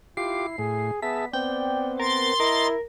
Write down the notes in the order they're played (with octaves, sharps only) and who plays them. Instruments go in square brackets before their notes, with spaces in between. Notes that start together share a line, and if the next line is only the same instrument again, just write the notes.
[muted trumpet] E4 [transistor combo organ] F4 G4 D6 [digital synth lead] C7
[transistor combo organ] A2 [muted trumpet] G#4
[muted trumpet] B3 [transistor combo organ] G#4 E5 A5 [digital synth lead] B6
[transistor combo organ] B3 C4 [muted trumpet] D5 [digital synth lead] G5
[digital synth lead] A#4 [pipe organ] C6 A6
[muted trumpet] E4 [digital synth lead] A#4 [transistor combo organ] D#5 A#5